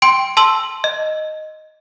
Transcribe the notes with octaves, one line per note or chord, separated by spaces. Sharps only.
G5 C6 D7
A5 C6 E6 F#7
D#5